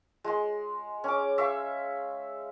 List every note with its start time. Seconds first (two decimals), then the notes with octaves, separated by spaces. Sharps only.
0.24 G#3 C6
1.04 C#4 D6
1.38 E5 F5 C#6